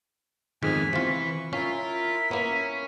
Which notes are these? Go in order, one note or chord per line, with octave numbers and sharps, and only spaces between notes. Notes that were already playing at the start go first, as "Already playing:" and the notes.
F2 G#2 D#3 B3 G#5 F6 B6
C3 E3 F4 C#6
C#4 E4 F4 A#4 B6
A#3 B3 C#4